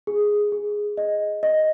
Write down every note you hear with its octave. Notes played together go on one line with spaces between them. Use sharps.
G#4
G#4
D#5
D#5